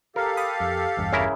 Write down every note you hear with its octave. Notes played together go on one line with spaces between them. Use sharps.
G4 A4 A#4 F5
G5 B5 D#6
F2
A1 E2 G2
C#3 E4 A#4